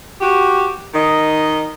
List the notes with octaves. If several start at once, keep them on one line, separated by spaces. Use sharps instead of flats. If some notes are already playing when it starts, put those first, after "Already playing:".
F#4 G4
D#3 D#5